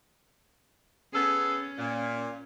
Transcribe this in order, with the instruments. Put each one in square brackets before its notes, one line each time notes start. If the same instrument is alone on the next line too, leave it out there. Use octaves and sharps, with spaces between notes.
[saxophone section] B3 G#4 A4 [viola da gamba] C#4
[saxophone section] A#2